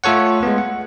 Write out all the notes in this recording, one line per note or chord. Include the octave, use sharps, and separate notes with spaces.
A3 F4 A4 C#5 F#5
G#3 B3
F#5